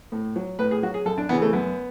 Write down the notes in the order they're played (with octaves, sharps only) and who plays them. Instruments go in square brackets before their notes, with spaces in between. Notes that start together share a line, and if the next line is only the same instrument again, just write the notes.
[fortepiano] A2
F#3
A2 B4
G#4
F#3 F#4
G#4
F#2 A4
D4
C#3 E3 B3
A3
F#2 B3